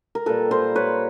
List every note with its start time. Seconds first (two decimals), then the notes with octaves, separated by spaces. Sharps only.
0.15 A#4
0.26 A#2 G3 A#3 A4 B4
0.51 A#4 C5
0.76 B4 C#5